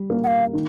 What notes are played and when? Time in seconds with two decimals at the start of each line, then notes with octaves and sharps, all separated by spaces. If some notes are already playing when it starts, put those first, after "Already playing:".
Already playing: G3
0.10 A#3
0.24 F#5
0.27 F5
0.53 D#3